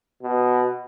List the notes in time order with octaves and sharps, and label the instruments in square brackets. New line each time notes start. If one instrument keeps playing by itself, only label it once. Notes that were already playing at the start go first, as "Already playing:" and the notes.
[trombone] B2